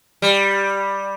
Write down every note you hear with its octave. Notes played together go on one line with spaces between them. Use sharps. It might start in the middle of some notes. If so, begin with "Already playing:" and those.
G3